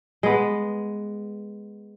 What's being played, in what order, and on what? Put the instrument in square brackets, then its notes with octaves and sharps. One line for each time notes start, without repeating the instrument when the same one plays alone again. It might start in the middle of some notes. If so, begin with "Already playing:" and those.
[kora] G#3 B3